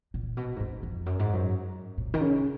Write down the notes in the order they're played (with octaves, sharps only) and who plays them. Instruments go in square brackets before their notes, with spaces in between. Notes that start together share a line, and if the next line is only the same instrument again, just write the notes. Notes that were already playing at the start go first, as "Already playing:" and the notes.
[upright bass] A#2
B2
G#2
F#2
F2
F#2
G#2
F#2
A#2
D#3
C#3